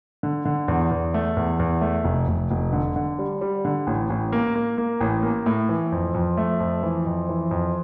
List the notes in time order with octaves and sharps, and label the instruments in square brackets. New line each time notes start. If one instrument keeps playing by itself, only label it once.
[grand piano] D3
D3
E2
E2
A3
E2
E2
A3
F1
F1
F1
D3
D3
G3
G3
D3
A1
A1
A#3
A#3
A#3
A1
A#3
A2
E3
F2
F2
A3
F2
E3
F2
E3
F2